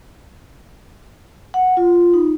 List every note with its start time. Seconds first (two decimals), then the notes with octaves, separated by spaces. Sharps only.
1.54 F#5
1.77 F4
2.13 D#4